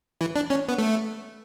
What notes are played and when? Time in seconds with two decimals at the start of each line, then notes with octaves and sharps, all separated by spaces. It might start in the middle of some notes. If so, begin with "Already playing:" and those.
0.21 E3
0.36 D4
0.50 C#4
0.69 B3
0.78 A3